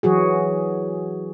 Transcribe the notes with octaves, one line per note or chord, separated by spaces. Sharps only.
E3 F#3 F#4 G#4